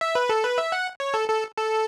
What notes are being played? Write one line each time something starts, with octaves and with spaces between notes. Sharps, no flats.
E5
B4
A4
B4
E5
F#5
C#5
A4
A4
A4